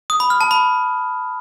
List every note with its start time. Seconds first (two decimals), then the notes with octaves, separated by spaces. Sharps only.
0.10 D#6
0.20 B5
0.30 F6
0.41 A5
0.51 B5